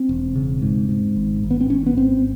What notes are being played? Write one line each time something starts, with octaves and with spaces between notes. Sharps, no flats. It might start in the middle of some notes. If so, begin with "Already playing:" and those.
Already playing: C4
E1
C#3
G#2
G#2
G#1
G#1
B3
C4
G#1 C#4
B3
G#1 C4